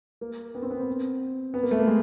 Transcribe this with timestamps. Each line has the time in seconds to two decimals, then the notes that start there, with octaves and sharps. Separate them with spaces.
0.21 A#3
0.55 B3
0.62 C4
0.71 B3
0.80 C4
1.54 B3
1.63 A#3
1.71 A3
1.79 A#3
1.87 G#3